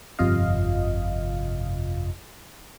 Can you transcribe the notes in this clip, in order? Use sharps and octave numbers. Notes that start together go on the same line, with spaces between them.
G1 F2 C3 F4 D#5 F5